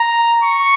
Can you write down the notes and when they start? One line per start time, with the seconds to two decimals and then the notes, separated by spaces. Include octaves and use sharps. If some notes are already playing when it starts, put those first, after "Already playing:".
Already playing: A#5
0.43 C#6